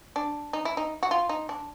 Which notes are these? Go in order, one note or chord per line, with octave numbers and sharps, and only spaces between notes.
D4
D#4
E4
D#4
F#4
F4
D#4
D4